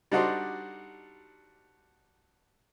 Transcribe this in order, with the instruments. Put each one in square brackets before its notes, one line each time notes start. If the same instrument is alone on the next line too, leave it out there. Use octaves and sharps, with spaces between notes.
[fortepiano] G3 D4 D#4 F#4 A4 C5